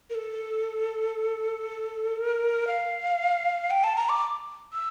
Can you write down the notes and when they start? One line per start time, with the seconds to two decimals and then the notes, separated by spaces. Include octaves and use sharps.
0.10 A#4
0.15 A4
2.16 A#4
2.67 F5
3.70 G5
3.84 A5
3.96 A#5
4.09 D6
4.73 E6